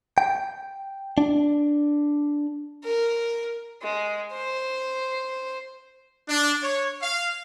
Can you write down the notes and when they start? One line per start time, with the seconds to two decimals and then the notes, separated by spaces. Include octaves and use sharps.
0.18 G5
1.18 D4
2.84 A#4
3.83 G#3
4.33 C5
6.29 D4
6.62 C#5
7.01 F5